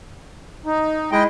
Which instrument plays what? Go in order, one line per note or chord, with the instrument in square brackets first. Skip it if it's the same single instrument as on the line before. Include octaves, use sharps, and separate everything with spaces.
[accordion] D#4
[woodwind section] G#3 E4 [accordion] D#5 G5